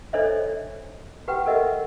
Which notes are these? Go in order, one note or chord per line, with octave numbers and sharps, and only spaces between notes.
D4 A4 C5 C#5 D#5 E5
F#4 G4 B4 F#5 G5
A4 A#4 D#5 E5 F#5